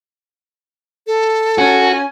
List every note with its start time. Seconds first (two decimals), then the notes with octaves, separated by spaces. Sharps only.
1.07 A4
1.58 C#4 F#4 G#5